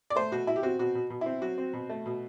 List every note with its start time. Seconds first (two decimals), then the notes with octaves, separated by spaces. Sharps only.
0.10 D5
0.16 A3 C5
0.31 B2 F#4
0.47 B2 E4
0.56 G4
0.63 C4 F#4
0.79 B2 F#4
0.95 B2
1.10 B2
1.21 C4 E4
1.42 F#3 F#4
1.58 C4
1.73 B2
1.90 A3
2.06 B2